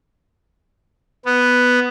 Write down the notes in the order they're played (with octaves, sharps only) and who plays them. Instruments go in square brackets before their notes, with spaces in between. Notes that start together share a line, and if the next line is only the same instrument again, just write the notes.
[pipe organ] B3